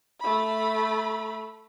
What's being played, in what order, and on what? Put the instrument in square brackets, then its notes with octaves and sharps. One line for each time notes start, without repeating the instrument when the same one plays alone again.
[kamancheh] A3 B5